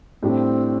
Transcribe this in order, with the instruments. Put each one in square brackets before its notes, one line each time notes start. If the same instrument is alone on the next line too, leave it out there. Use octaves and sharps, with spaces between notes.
[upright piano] A2 G3 D4 G4 [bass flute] C4